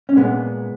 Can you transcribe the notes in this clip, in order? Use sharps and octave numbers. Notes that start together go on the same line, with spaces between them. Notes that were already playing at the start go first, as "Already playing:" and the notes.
C#4
A#2 G#3 B3